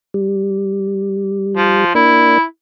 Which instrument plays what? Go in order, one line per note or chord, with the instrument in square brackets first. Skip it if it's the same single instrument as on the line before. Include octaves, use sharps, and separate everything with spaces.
[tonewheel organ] G3
[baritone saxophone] F3
[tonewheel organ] A#3 D4 [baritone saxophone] E4